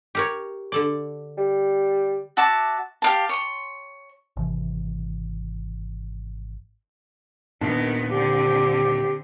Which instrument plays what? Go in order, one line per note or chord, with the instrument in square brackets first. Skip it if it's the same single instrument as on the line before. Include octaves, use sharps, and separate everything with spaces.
[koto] G4 A#4 C#5
D3 A4 D5
[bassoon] G3
[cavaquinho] F#4 E5 A5 D6
G4 F5 A5
C#5 C6
[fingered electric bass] G#1 C3 E3
[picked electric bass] D#1 A#2 D4 [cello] D#3 B3
[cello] D3 C4 [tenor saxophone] G4